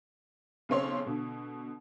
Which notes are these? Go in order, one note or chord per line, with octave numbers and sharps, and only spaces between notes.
B1 C#3 C4 C#5 C6
B2 D3